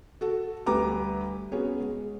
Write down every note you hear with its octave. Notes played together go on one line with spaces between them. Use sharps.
F#4 A4
D2 G3 B4 A#5 D6
B3 C#4 F#4 G#4 C#5
G#3